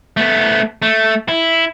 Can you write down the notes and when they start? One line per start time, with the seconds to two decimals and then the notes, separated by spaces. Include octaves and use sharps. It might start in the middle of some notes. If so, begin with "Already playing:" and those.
0.17 A3 B3
0.82 A3
1.28 E4